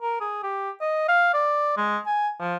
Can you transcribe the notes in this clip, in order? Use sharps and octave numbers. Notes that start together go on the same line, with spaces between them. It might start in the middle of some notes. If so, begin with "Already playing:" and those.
A#4
G#4
G4
D#5
F5
D5
G#3
G#5
F3